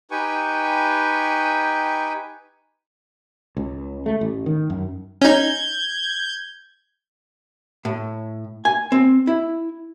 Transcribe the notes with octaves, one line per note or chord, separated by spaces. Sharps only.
D#4 G4 B4 G5 G#5 C#6
C#2
A3
A1
D#3
F#2
C#4 D#4 G6 G#6
A2
G#5
C4
E4